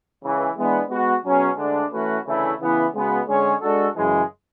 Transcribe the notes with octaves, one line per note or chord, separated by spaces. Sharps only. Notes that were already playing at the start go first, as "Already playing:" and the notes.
C#2 C#3 E3
E3 G#3 B3 D4
G#3 B3 F#4
B2 F#3 C#4 G#4
D2 D3 G#3 D4
E3 A3 C#4 F#4 B4
D2 C#3 E3 A3 E4
C#3 E3 B3 E4
C#3 G#3 B3 F#4
D3 G#3 C#4 G#4 C#5
G#3 D4 F#4 A4
F#2 C#3 E3 G#3